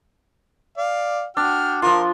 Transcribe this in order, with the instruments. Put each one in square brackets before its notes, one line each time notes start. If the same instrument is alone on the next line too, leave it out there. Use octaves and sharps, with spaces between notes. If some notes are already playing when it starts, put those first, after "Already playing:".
[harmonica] D5 F5
[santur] D4 [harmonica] F#4 G5 F6
[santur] F3 F4 [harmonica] A#4